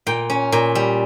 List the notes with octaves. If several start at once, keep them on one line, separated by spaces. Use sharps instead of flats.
A#2 G5
C#4
A#2
G3